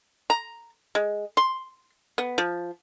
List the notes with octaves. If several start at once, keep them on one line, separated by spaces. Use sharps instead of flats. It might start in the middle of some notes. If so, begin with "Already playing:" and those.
A#5
G#3
C6
B3
F3